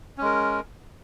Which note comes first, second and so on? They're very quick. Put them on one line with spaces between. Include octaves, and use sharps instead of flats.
C#4 G#3 A#4